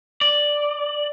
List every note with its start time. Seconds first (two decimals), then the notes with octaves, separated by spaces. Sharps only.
0.21 D5